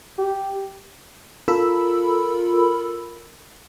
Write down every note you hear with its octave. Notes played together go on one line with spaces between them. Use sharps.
G4
F4 A4 A#4 B5 E6